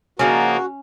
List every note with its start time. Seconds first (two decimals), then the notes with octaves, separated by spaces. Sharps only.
0.19 C#3 F3 A#3 C#4 D#4 F#4